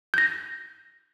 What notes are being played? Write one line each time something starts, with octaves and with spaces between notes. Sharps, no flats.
G6 A#6